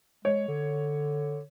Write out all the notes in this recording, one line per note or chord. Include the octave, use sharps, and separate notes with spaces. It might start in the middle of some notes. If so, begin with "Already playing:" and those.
G#3 C#5
D3